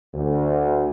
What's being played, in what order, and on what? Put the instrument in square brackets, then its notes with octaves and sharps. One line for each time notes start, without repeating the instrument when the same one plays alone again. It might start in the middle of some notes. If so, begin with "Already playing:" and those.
[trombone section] D2